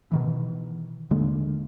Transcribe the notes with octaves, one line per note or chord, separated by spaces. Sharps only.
B2 D#3 E3
D#1 D3 G#3 A#3